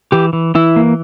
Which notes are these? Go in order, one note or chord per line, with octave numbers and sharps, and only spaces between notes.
E3 G4
E3
E3 E4
A#3